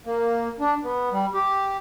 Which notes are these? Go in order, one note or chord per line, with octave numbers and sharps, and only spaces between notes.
A#3
D4
B3
G3
G4